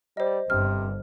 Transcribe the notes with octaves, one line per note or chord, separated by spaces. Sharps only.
G3 C5 D#5
G1 G2 C3 F6